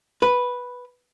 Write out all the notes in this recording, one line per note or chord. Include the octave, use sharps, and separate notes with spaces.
B4